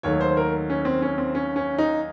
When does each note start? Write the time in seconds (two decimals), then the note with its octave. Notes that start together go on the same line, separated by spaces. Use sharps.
0.03 D#2 D#3 F#3 A3 C#5
0.21 C5
0.37 A#4
0.70 C#4
0.85 C4
1.02 C#4
1.18 C4
1.35 C#4
1.56 C#4
1.78 D#4